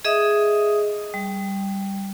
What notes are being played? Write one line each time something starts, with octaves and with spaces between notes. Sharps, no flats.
G#4 D#5 E5 D#6
G3